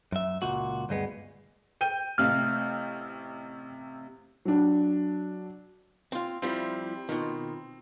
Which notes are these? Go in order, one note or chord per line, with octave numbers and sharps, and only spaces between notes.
F#2 E5
C#2 A#2 F#4
D2 G2 G#3 B3
G5 G6 D#7
A1 C3 F5 F6
F#3 D4
C4 F4
F3 G3 C4 E4 F4
B2 D#3 F4